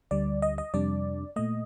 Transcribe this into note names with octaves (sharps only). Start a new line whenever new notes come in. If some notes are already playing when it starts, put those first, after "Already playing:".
D2 D3 G3 D5
D#5
D#5
F2 C3 G3 D4 D5
A#2 A3 D#5